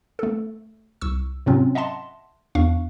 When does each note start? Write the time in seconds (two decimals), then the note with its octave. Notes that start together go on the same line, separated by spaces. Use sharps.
0.19 A3 A4
1.01 C2 C#6 E6
1.46 G#2 C3 F#3 C4 C#4 F4
1.75 D#5 E5 F#5 A5 C6
2.55 E2 D4 F5 C#6